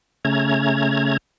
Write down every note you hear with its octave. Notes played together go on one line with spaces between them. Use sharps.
C#3 A3 C#4 A#5 G#6